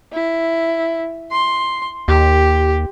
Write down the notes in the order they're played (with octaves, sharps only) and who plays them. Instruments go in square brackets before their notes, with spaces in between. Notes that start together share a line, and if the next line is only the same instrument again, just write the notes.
[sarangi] E4
C6
[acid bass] D#2 [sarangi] G4